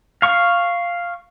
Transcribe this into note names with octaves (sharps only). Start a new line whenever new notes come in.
F5 C#6